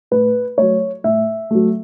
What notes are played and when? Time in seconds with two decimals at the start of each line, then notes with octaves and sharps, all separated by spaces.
0.11 A2 B4
0.58 F#3 A3 C#5
1.04 A2 E5
1.51 F#3 A3